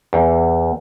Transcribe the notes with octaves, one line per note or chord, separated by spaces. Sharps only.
E2